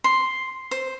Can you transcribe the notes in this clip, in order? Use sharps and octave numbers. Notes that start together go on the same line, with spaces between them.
C6
C5